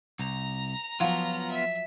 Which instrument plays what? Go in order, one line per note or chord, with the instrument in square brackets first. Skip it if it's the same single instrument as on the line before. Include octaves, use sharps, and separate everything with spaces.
[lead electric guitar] C2 [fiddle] A#5
[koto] F3 F#3 [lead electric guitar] B3 F4
[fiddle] E5